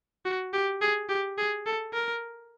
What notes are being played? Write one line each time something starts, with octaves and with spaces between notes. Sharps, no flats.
F#4
G4
G#4
G4
G#4
A4
A#4